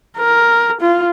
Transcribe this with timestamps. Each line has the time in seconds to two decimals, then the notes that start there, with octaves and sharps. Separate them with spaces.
0.19 A#4
0.81 F4